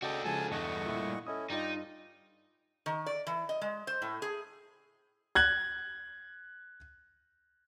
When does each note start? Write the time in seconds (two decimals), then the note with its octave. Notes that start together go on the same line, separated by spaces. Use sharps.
0.02 C#3 F#4 A4 D5 D#5 G5
0.25 C#3 F3 G#3 G#5 A5
0.51 E2 G2 A3 D#5 F#5 C#6
0.86 A#2 E4
1.27 C#4 E4 A4 D#5 D#6
1.50 G2 D#4 F4 D5 D#5 G5
2.86 D#3
3.06 D5
3.27 E3
3.49 D#5
3.62 G#3
3.87 C5
4.02 A2
4.22 G#4
5.35 F#6 G#6 F#7